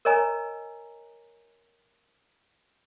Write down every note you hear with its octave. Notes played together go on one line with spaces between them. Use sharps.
A#4 C#5 D#5 G#5 A#5